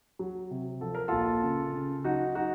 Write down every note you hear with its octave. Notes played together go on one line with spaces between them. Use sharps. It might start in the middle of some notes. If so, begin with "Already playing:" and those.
F#3
C3
F3 A4
A#4
A#1 F4 A4
C#3
C#3
F#3 D#4 F#4
D#4 F#4